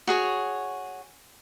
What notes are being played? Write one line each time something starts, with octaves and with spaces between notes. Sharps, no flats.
F#4 G#4 C#5